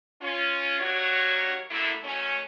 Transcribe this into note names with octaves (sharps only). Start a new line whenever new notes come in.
C#4 F4
D#2 F#3 D4 F#4 A#4 C#5
F#2 D3 A3 A#3 E4
D#3 F#3 A3 C#4